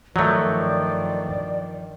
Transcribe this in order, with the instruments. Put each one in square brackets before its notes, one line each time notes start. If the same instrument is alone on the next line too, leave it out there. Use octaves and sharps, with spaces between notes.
[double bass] G2 D#3 [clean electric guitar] F3 [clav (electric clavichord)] F#3 A3 [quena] D5